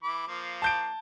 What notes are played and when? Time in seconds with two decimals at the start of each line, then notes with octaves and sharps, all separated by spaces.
0.03 E3 B5 D6
0.27 F3 A#3
0.62 A5 G6 D7